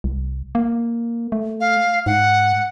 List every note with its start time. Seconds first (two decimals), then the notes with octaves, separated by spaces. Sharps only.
0.04 C2
0.55 A#3
1.32 A3
1.60 F5
2.06 G#2 F#5